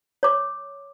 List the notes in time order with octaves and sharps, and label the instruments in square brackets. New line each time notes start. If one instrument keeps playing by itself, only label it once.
[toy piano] C#5 D6